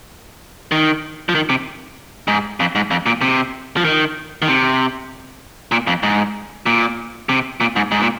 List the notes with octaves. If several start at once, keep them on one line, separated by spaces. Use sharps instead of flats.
D#3
F3
D#3
C3
G#2
F2
G#2
F2
A#2
C3
F3
D#3
D#3
C3
A#2
F2
G#2
A#2
C3
A#2
G#2
G#2
A#2